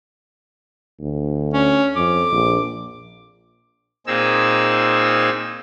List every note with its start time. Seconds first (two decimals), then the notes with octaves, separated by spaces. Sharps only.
1.00 D2
1.53 C#4
1.96 F2 D6
2.31 A#1
4.07 A#2 C4 D#4 G#4 E6